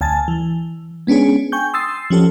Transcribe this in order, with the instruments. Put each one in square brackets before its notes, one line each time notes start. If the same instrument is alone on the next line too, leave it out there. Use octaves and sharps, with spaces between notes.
[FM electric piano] D2 G#5 A5 A6
E3
G#3 B3 C#4 D4 G#4
G5 G#5 C#6 G6
C6 D#6 E6 A6 C7
F3 C#4 G4 A4